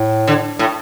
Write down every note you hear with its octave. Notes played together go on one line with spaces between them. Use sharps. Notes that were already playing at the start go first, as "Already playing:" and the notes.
Already playing: A2
D3
A2